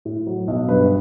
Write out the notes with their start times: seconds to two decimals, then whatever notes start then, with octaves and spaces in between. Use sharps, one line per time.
0.05 A2
0.26 F#3
0.48 B1
0.68 G2 B4